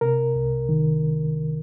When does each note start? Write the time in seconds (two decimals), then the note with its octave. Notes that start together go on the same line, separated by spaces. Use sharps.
0.01 C3 A#4
0.36 C2
0.69 D#3